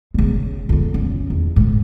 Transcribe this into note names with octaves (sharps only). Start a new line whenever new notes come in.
C#3 G#3
F2 C#3
C#3
E2
G#2